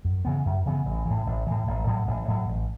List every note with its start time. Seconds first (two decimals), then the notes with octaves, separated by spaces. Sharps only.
0.05 F#2
0.25 C#3 E3 B3
0.46 F#2
0.66 C#3 E3 B3
0.86 A1
1.06 A2 E3
1.27 A1
1.47 A2 E3
1.67 A1
1.87 A2 F#3
2.07 A1
2.28 A2 F#3
2.48 A1